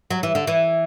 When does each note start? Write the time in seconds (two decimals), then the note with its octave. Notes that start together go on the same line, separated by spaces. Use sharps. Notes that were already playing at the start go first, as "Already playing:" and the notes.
0.11 F#3
0.23 E3
0.35 D3
0.47 E3